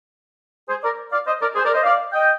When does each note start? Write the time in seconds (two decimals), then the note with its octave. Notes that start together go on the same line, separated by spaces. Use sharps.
0.69 G#4 C5
0.83 A#4 D5
1.12 D5 F5
1.26 C5 D#5
1.41 A#4 D5
1.56 G#4 C5
1.65 A#4 D5
1.74 C5 D#5
1.84 D5 F5
2.13 D#5 G5